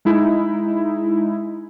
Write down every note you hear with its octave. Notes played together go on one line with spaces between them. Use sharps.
G#3 D#4 E4